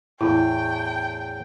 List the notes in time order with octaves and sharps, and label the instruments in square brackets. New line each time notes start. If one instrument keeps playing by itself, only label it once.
[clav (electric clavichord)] E2 A2 [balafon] E4 [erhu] G5